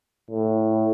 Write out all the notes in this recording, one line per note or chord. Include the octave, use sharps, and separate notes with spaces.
A2